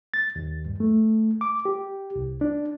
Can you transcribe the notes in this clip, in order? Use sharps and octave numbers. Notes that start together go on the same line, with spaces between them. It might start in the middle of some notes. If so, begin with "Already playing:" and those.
A6
D#2
G2
A3
D6
G4
C2
D4